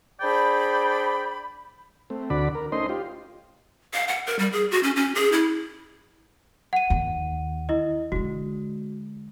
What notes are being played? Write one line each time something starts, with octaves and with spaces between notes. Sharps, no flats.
D4 G#4 C5 D5 G5 B5
A3 C4
D2 D3 F#4 D5 B5
A#4
A3 C#4 D#4 C5 D#5 C6
F4 G4
F5
F#5
A#4
G3
G#4
F#4
C#4
C#4
G#4
E4
F#5 D#7
D#2
E4 D#5
D3 G#3 F#4